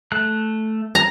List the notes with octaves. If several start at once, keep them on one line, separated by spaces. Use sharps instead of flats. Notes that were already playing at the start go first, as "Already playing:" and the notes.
A3 A5 F#6
A#5